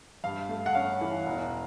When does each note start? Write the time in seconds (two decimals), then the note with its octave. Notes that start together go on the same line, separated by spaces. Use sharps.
0.24 G2 F5
0.49 A3
0.66 F#5
0.75 C#4 F5
1.01 E3
1.26 E1